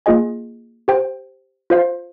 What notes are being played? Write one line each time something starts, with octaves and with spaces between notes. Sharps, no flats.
A#3 F4 G#4 D#5 G#5
G4 C5 G5
F4 C5 F5